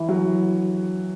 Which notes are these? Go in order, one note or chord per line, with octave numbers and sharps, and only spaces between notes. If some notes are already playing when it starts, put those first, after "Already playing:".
Already playing: E3 E4
F#3 F#4